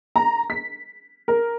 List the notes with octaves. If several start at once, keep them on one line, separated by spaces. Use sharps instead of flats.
A#5
B6
A#4